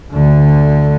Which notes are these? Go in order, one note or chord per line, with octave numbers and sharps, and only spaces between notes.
D2 D3